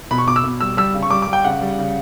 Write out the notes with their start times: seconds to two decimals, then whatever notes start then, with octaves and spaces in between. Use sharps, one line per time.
0.11 B2 B5
0.18 C#6
0.27 B2 D6
0.36 E6
0.44 B2
0.61 G3 E6
0.77 G3 E6
0.94 C#3
1.03 C#6
1.10 G3 D6
1.22 G3 D6
1.33 G5
1.45 C#3 F#5
1.61 G3
1.79 C#3